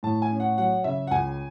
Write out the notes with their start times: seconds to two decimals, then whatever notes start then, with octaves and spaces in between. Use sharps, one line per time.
0.03 A2 A5
0.22 G#5
0.31 C#4
0.40 F#5
0.57 F#3 F#5
0.84 C#3 E5
1.07 F#5
1.11 C#2 G#5